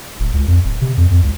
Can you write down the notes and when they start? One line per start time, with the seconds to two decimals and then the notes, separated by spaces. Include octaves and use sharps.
0.20 D1
0.34 C#2
0.48 F2
0.64 D1
0.81 C3
0.97 F2
1.10 F2
1.23 C#2